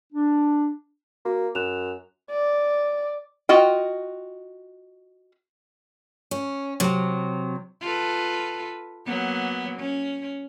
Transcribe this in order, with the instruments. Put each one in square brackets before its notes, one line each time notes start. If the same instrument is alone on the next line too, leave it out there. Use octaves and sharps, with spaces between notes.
[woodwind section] D4
[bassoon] A#3 [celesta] F#4
[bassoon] F#2 [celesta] F#6 E7 F7
[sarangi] D5
[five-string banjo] F4 F#4 D#5 G5
[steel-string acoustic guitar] C#4
C3 F#3
[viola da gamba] F4 A4 B4
F#3 A#3 B3
C#4